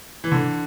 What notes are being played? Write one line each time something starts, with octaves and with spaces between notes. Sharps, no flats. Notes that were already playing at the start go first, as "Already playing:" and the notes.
E3
D3